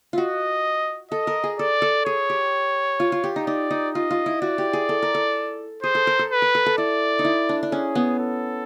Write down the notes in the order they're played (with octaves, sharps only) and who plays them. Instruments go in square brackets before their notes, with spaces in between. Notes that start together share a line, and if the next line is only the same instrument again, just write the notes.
[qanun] F4 F#4 [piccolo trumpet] D#5
[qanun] A4 [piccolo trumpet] D#5
[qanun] A#4
G#4
[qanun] A4 [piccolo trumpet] D5
[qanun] A4
[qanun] G#4 [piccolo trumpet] C#5
[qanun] G4
F4
F4
G4
D#4
[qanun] D#4 [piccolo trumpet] D5
[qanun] D#4
[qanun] F4 [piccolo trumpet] D#5
[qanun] F4
E4
[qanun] F#4 [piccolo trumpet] D5
[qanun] G4
G#4
A4
A#4
A4
[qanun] G#4 [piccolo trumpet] C5
[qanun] A4
A#4
A4
[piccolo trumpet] B4
[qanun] A#4
A4
A4
[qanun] E4 [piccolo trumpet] D5
[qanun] D#4
E4
D4
D4
[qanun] C#4 [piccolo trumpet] G#4
[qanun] B3
[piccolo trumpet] A4